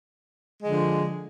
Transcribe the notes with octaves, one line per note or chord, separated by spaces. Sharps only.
D3 F3 G#3